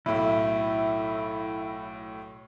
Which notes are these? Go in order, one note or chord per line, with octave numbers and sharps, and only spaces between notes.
B1 A2 E4